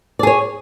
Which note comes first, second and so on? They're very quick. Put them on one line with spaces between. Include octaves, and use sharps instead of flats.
D5 G#4 C#5